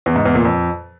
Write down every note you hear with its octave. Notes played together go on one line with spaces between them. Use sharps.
E2
G#2
E2
A#2
F2